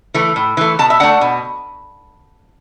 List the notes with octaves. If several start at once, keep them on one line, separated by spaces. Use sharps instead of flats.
E3 A3
A2
E3 A3
B2 A5
E5
A3 D4 F#5
B2